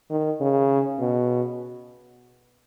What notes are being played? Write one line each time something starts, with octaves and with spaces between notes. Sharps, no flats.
D#3
C#3
B2